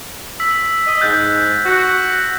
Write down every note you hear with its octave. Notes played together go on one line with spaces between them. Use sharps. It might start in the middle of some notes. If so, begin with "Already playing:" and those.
E6 B6
D#5
G#2 F#6 G6 A6
F#4